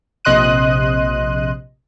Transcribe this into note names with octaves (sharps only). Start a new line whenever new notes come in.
A#1 C3 D#5 C6 F#6 D#7